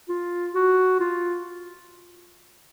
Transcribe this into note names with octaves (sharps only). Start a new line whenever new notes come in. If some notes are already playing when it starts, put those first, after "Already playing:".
F4
F#4
F4